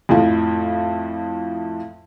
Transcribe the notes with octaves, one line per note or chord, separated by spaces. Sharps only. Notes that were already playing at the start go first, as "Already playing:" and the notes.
F2 A2 F3